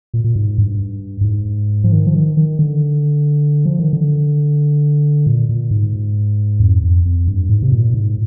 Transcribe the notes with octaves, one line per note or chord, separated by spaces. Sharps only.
A#2
A#2
G#2
G2
G2
G#2
F3
D#3
F3
D#3
D#3
D3
F3
D#3
D3
A#2
A#2
G#2
F2
F2
F2
G2
G#2
C3
A#2
G#2